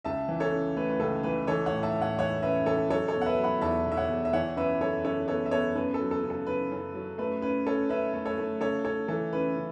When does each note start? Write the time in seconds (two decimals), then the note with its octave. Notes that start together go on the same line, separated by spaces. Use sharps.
0.05 C#2 E5 A5
0.28 E3
0.40 A4 C#5
0.52 C#3
0.76 A3 B4
0.89 B4
1.00 C#2 A4
1.23 E3 B4
1.47 E3 A4 C#5
1.66 A2 C#5 F#5
1.83 E5 A5
1.96 A2
2.01 C#5 F#5
2.19 E3 C#5 F#5
2.43 C#4 B4 E5
2.66 E3 A4 C#5
2.90 F#3 A4 C#5
3.08 A4 C#5
3.15 B2
3.21 F#5
3.26 B4 E5
3.38 F#3
3.44 F#5 B5
3.61 E2 E5 A5
3.85 B2
3.92 E5
3.97 C#5 F#5
4.09 E2
4.25 E5
4.33 E3 C#5 F#5
4.57 F#2 B4 E5
4.81 F#2 A4 C#5
5.05 F#2 A4 C#5
5.28 B3 A4 C#5
5.46 E5
5.51 B3 A4 C#5
5.75 F#2 B4
5.94 A4
6.00 F#3
6.11 A4
6.23 C#3
6.30 A4
6.47 C#3 B4
6.72 F#2
6.95 F#3
7.18 A3 B4
7.42 C#4 B4
7.66 C#4 A4 C#5
7.89 C#4 B4 E5
8.14 A3
8.25 A4 C#5
8.38 A3
8.61 C#3 A4 C#5
8.84 C#4 A4 C#5
9.08 E3 A4
9.32 C#4 B4
9.56 C#3